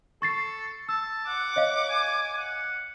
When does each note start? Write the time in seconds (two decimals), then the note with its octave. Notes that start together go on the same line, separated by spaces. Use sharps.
0.22 A4 C#6 A6 C7
0.89 A5 E6
1.27 F#5 D6
1.56 C#5 D#5 F5
1.90 G#5
2.37 F#5